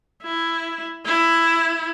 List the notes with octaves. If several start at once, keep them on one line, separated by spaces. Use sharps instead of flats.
E4
E4